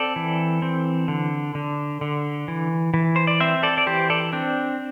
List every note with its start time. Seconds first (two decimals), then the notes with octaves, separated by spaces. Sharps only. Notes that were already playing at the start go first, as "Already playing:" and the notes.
Already playing: C4 A4 D5
0.16 E3
0.62 C4
1.08 D3
1.55 D3
2.01 D3
2.48 E3
2.94 E3
3.16 C5
3.27 D5
3.40 C4 C5 E5
3.63 A4 D5
3.78 D5
3.86 E3 G4 C5
4.10 A4 D5
4.33 C4 D4